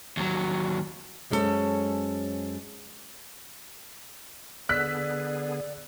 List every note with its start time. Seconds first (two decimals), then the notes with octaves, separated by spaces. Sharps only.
0.17 D#2 F#3
1.31 F#2 G#3 C#4 D4 A4 C5
4.69 D3 B3 G#4 D5 E6 F#6 B6